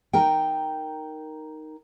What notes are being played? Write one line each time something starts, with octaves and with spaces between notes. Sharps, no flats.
D#4 A#4 G5